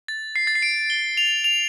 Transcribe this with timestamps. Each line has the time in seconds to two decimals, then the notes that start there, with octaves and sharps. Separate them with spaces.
0.08 A6
0.36 C7
0.47 A6
0.55 C7
0.62 D7
0.90 G7
1.17 F7
1.44 F7